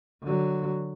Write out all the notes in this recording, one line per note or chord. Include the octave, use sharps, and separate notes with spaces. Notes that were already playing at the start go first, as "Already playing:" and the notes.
D3 F#3